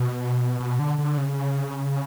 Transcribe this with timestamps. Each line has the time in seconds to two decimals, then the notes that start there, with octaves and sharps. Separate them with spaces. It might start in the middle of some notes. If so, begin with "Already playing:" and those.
Already playing: B2
0.60 B2
0.79 D3
0.99 D3
1.17 C#3